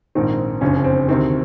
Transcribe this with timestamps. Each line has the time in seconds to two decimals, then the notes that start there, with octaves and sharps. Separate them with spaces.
0.15 A#1 G#2 D#3 C4
0.61 F#1 F2 D3 C#4
0.84 C4
1.08 D2 C3 D#3 C4